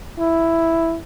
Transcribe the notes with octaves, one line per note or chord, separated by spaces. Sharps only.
E4